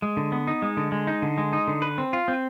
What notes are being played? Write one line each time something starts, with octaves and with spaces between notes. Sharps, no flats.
G#3
D3
B3
D#4
G#3
D3
G#3
D#4
D3
G#3
D#4
D3
B4
C4
F4
C4